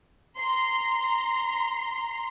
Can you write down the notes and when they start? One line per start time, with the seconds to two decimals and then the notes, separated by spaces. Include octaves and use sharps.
0.38 A#5 C6